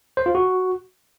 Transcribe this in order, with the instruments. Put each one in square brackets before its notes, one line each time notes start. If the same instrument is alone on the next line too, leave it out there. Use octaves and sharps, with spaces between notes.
[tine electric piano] C5
F4
F#4